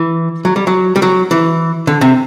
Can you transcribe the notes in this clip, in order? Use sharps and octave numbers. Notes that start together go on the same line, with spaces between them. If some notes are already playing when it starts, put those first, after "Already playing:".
Already playing: E3
F#3
G3
F#3
G3
F#3
E3
D3
C3